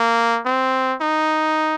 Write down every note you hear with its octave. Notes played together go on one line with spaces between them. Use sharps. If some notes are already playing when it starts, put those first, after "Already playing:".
Already playing: A#3
C4
D#4